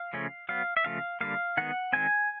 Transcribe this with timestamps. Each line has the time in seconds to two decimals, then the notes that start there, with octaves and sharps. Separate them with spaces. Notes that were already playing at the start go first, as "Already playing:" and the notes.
Already playing: F5
0.13 C#3 F3 A3 C#4
0.49 F#3 B3 F5
0.77 E5
0.84 C#3 F3 A3 F5
1.21 D3 G3 A#3 F5
1.57 D#3 G#3 B3 F#5
1.93 D#3 G#3 C4 G#5